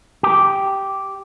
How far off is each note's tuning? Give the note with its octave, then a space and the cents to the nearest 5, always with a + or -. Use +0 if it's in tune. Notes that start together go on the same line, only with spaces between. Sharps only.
G4 -5